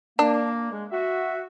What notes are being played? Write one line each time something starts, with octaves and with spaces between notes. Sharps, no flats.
A#3 D4
G#3
F#4 E5